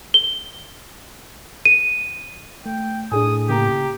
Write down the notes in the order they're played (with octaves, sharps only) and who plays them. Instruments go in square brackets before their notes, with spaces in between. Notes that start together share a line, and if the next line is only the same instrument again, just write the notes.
[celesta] G7
D#7
[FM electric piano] A3 [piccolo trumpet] G5
[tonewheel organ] A2 [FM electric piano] D4 G#4 G#5 [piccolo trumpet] D#6
[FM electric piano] C#3 A#3 A#5 [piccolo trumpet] G4